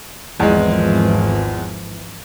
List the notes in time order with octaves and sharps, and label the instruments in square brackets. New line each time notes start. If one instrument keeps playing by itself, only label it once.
[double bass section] G#1 E3 F3 [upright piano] E2 G#3